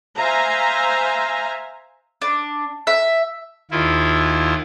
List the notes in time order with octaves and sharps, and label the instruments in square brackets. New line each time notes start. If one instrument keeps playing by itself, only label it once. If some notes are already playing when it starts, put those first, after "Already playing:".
[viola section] C5 E5 F5 G#5 A#5
[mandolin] D4
E5
[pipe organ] D#2 E4 F4